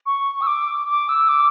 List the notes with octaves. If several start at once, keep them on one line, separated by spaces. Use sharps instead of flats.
C#6
E6
D6
D6
E6
D6